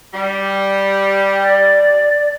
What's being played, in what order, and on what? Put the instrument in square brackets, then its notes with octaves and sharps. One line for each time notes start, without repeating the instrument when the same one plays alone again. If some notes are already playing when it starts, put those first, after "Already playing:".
[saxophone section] G3
[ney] D5